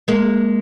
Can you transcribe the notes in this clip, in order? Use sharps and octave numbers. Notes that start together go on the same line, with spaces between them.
G#3 A#3